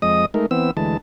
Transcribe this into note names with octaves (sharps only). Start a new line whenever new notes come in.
F2 G#3 D#5 D#6
G#3 A3 D#4 A#4
E3 B3 C4 E6
D2 E3 G#3 A5